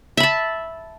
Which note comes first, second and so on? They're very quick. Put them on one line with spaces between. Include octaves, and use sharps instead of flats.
E5 B5 A5